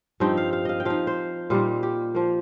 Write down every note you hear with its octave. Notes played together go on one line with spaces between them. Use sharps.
G2 F3 C4 D#4 G5
F5
F5
D#5 F5
G5
F3 D#4 F5
C5
A#2 G3 A#3 D#4 F4
G4
F3 A#3